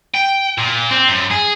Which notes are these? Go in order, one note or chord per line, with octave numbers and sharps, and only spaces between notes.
G5
A#2
C4
F#2
G#4